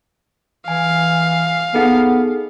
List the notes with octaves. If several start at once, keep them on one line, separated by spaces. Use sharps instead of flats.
E3 F5 G#5
B3 D#4 G#4 A4